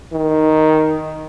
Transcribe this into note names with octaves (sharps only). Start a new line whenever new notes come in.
D#3